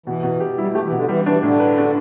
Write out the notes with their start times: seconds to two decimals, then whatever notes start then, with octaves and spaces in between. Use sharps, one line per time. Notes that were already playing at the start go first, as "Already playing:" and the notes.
0.06 B2 E3
0.23 B2
0.40 G4
0.58 G3 E4
0.71 A3
0.75 G4
0.84 E3
0.91 B2 D3
1.08 E3 G3
1.26 E3 D4
1.43 A2 D3
1.60 B4
1.78 D4